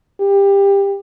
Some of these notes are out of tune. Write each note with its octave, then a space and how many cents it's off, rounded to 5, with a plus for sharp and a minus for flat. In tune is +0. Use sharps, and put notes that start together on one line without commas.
G4 +20